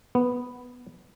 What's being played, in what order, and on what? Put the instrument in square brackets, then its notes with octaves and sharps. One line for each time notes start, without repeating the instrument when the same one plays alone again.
[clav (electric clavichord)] B3